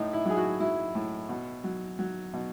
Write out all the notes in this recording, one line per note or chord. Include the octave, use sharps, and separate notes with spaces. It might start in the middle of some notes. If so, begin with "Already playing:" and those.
Already playing: A2 D#4
E4
F#3 G#4
F#4
F#3 E4
A2
B2
F#3
F#3
B2